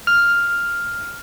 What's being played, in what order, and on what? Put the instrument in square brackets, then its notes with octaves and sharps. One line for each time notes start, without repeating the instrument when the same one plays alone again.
[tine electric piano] F6